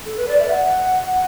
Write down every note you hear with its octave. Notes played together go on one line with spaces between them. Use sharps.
A4
B4
D5
E5
F#5